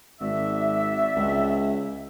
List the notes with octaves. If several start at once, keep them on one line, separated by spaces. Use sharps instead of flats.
G#1 F#4 D5 E5
C#2